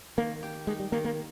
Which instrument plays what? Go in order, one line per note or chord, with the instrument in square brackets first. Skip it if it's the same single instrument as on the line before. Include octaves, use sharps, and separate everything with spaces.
[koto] D#3 [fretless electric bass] A#3
[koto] G4
[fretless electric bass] G#3 [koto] D#4
[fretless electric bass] G3
[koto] D#3 [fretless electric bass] A#3
[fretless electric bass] A#3